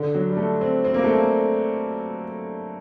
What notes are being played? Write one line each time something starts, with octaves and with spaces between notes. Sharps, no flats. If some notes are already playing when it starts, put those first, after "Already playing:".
Already playing: D3
F#3
G3
A3
C4
C4
A#3
A3
A#3